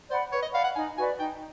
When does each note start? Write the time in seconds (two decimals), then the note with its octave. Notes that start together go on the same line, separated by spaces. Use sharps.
0.10 C5 D5 F#5 B5
0.32 B4 C#5
0.42 D#5
0.53 D5 F5 F#5 B5
0.64 F#5
0.75 D#4 G#5
0.97 F#4 B4 D5 G#5
1.19 D#4 G5